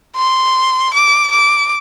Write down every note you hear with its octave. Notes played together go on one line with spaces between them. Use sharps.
C6
D6
D6